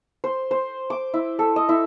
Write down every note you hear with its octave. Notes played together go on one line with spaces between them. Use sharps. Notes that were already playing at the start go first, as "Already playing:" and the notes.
C5
C5
D6
E4
A4
D#5
E4